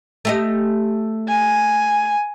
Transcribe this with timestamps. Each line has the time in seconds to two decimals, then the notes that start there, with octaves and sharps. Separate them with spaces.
0.25 A3 G4 D#5
1.28 G#5